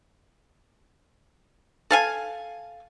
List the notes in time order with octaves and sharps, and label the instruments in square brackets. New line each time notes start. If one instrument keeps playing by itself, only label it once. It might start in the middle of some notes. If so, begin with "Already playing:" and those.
[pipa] A4 F5 G#5